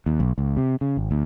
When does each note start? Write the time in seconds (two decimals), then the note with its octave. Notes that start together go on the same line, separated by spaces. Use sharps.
0.06 D#2
0.20 B1
0.38 C#2
0.57 C3
0.81 C#3
0.97 G#1
1.11 D2